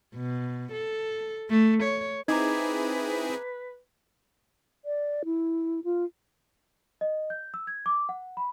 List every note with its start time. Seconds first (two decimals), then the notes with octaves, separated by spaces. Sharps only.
0.15 B2
0.72 A4
1.49 A3
1.83 C#5
2.28 C4 D#4 E4 G#4 B4 A#5 D6 G#6
4.85 D5
5.25 E4
5.84 F4
7.01 D#5
7.30 G6
7.54 E6
7.67 G#6
7.86 D6
8.09 F#5
8.37 B5